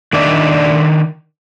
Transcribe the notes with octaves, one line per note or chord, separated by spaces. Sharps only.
D#3 D4 D5 E5